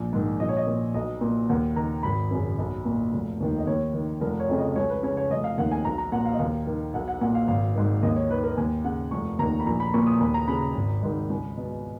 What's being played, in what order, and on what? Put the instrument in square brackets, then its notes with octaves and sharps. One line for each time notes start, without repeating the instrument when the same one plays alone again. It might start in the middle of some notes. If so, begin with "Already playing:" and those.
Already playing: [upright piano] A#1
G#2 D#3
A#1 D#5
C#5
D#5
A#2
B1 D#5
A#2
D#2 F#5
D#3 A#5
G#1 B5
F#2 C#3
B1
A#2
F1
D#2 D#3
D#5
D#2 C#5
D#3
F1 A#4
C#5
F2 C#3
D#5
C#2 C#5
B4
C#3 C#5
C#5
F1 D#5
F5
D#2 D#3 F#5
G#5
B1 A#5
A#5
A#2 F#5
F5
D#5
D#2 F5
D#3
B1 F#5
F#5
A#2 F#5
F5
G#1 F5
G#2 D#3
D#2 D#5
C#5
D#3 B4
A#4
D#2 G#5
C#3 F#5
F1 C#6
D#2 D#3 A#5
B5
A#1 A#5
B5
A#2 C#6
D#6
D#2 B5
A#5
C#3 B5
G#1
G#2 D#3
C#2
B2